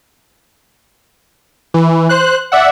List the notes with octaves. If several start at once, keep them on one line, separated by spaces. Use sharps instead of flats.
E3
C5 F#6
D5 E5 F#5